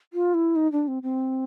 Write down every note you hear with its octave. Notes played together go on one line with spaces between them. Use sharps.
F4
E4
D#4
D4
C4
C4